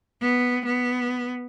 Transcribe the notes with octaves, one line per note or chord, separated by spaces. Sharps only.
B3
B3